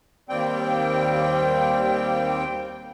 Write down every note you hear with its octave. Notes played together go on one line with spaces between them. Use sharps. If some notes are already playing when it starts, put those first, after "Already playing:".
D#2 G3 C4 G5